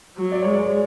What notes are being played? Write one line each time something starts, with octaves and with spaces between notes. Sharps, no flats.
F#3
D5
G#3 C#5
D5